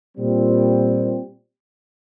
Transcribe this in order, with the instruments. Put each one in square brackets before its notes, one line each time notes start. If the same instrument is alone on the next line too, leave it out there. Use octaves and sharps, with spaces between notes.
[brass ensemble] A#2 G3 C4 G4